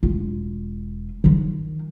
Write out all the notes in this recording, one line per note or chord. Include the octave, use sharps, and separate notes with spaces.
E1 F4
D#3 F3